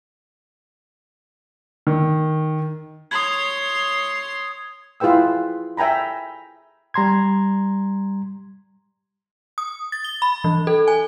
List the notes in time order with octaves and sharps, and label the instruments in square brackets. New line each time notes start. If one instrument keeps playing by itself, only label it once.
[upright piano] D#3
[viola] C#5 C6 [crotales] D#6 G#6
[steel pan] E4 F4 G#4 B4 G5 E6
E5 G5 G#5 A#5 B5
[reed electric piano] G3 A#5 C6 G#6
[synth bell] D#6
A6
G7
B5
E3
A4
G#5